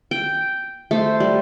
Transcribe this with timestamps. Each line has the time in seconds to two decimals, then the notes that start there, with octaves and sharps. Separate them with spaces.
0.11 G5
0.91 A3 C5
1.20 G3